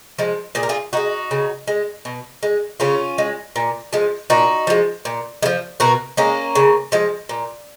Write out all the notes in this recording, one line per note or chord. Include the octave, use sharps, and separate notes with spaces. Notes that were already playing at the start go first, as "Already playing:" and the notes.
F3 G#3
A#2 G#4
A#4
F4 G#4
F3 G#3 D#4 F#4
C#3
G#3
B2
G#3
C#3 C#4 F4
G#3
A#2
F3 G#3
A#2 D#4 F#4
F3 G#3
A#2
G#3
F3
B2 F#4 A#4
G#3 A#3 C#4
C#3
F3 G#3
A#2